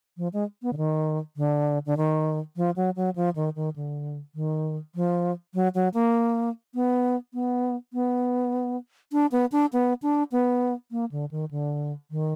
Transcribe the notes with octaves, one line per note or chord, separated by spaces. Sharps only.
F3
G#3
B3
D3
D#3
D3
D3
D#3
F3
F#3
F#3
F3
D#3
D#3
D3
D#3
F3
F#3
F#3
A#3
B3
B3
B3
D4
B3
D4
B3
D4
B3
A#3
D3
D#3
D3
D#3